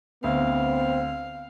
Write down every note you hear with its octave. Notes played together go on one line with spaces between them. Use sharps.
D2 B3 C4 F5